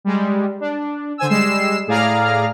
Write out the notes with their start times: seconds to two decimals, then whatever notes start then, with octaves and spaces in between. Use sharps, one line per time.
0.04 G3 G#3
0.60 D4
1.18 D3 C5 G#5 E6
1.30 G3 G#3 E6 C7 E7
1.87 A2 G#4 D5 F5 A#5 F6